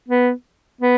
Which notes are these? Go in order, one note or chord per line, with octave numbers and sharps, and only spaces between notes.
B3
B3